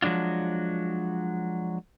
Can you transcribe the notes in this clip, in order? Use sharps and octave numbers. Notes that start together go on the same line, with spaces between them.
F3 F#3 G#3 D4 F4